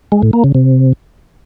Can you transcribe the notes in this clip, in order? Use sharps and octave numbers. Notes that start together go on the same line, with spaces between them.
G#3
A2
A#3
C#3
C3